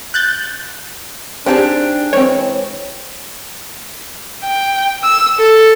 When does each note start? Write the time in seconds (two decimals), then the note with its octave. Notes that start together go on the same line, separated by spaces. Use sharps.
0.14 F#6 G6 A6
1.46 C4 D4 D#4 G4 G#4 A5
2.13 E3 G#3 C4 C#5
4.44 G5
5.03 E6
5.39 A4